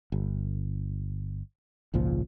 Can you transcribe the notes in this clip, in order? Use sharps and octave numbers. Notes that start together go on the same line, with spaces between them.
G1
G#1 C#2 A#2 F3